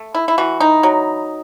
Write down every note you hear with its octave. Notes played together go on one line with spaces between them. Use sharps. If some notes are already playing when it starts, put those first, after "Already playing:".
Already playing: A3
E4
E4
E3 F#4
D#4
F#3